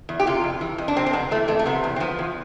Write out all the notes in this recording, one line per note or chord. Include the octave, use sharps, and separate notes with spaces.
E2
G4
C3 F4
F2
E3
F2
D4
C3 C4
C4
F2 B3
E3 A3
F2 A3
A3
C3 B3
E2
C4
F3 B3
E2